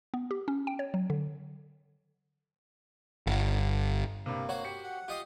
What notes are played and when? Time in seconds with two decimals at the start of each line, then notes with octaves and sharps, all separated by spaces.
0.14 B3
0.31 G4
0.48 C#4
0.67 G5
0.79 C#5
0.94 F#3
1.10 D3
3.27 G1
4.26 G2 C3 A#3
4.49 F#4 C5 C#5
4.64 G4 C#7
4.84 F#5
5.08 F4 G4 D#5 C6